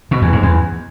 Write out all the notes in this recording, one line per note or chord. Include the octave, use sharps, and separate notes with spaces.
B2
E2
G#2
E2